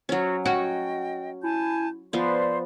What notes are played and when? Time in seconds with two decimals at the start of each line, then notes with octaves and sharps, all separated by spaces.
0.09 F#3 C#4 F#4
0.46 C#4 F#4 D#5 G5
1.43 E4 G#5 A5 G6
2.13 F3 B3 B4 C5 D5 C6